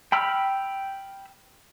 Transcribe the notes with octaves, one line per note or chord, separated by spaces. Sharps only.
G5 B5 E6 F6